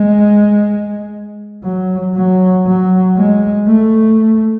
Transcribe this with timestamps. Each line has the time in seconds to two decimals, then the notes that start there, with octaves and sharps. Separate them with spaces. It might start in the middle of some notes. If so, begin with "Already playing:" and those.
Already playing: G#3
1.64 F#3
2.15 F#3
2.66 F#3
3.17 G#3
3.67 A3